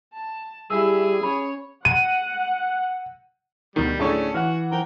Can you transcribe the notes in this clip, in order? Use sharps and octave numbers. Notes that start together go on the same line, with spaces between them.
A5
G3 E4 G#4 E6
C#4 C#5 B5
F#5 D#7
D2 B2 D#3 G3
A2 D3 A3 C#4 G#4 A4 D5 C#6
E3 F#4 F#5 F6
F3 A#4 G5